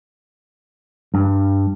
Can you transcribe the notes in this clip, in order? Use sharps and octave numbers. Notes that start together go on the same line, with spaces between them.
G2